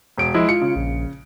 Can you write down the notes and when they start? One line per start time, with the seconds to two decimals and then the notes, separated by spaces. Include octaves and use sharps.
0.17 E1 D7
0.34 F3 G#3 E4
0.49 F4 C#7
0.62 C#3
0.76 A#1